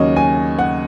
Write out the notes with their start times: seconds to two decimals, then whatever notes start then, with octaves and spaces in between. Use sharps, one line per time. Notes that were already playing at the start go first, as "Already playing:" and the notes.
Already playing: D#2 C#3 F#3 C#5 D#5
0.16 G#5
0.59 F#5